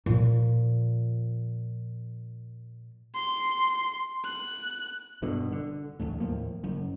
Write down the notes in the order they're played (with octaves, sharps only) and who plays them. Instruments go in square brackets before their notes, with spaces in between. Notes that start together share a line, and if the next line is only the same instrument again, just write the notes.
[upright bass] A#2 F3
[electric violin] C6
F#6
[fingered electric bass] G1 G2 B2 D3
D3
A1 D2 A2
D#2 A2 F3 A#3
F#1 F#2